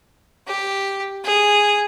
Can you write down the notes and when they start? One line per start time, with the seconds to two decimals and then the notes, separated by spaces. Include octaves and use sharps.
0.47 G4
1.25 G#4